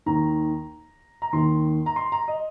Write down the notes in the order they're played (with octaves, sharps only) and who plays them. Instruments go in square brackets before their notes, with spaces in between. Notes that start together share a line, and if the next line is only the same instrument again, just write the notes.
[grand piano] D#2 D#3 A#5
A#5
D#2 D#3 C6
A#5
C6
A#5
D#5